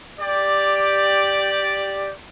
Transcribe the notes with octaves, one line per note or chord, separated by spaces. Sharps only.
G4 D5